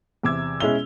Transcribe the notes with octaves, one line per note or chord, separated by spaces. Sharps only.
E2 C3 D6 E6 G#6
B2 G#3 C#4 E4 F7 G7